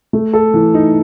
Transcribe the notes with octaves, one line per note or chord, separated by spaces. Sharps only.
A3
A4
E3
D#4